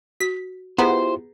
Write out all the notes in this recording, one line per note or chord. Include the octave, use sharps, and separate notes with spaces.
F#4 B6
B3 E4 F4 G4 G#4 B4 C5 A#5